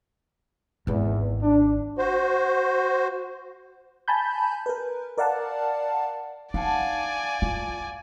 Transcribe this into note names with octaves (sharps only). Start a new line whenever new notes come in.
G#1 E2 D#3
D4
F#4 C5
G#5 A5 B5 G6
A#4 B4
A#4 D5 F5 F#5 A5
D#4 D5 F5 F#5 G#5 A5
F4